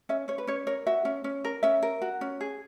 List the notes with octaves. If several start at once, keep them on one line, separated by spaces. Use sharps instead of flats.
C#4 E5
C#4 C#5
B4
C#4 C#5
A#4 C#5
F#4 E5
C#4
C#4
A#4
C#4 E5
A#4
F#4
C#4
G#4